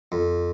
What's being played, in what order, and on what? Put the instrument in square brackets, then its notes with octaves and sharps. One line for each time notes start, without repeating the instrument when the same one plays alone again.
[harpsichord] F2